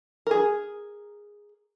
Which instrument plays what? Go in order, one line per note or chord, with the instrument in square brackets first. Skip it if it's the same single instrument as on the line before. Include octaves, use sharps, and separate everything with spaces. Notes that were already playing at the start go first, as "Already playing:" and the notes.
[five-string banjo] G#4 A#4